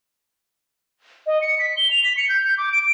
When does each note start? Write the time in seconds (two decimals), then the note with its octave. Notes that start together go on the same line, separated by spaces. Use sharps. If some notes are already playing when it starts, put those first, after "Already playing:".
1.27 D#5
1.41 C#7
1.59 B6
1.77 G7
1.90 F7
2.04 B6
2.17 C#7
2.29 G6
2.44 G6
2.57 D6
2.72 D7